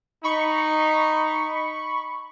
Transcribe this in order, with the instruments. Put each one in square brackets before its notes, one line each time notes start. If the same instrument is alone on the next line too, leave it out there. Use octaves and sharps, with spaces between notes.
[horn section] D#4 [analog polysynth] B5 C#6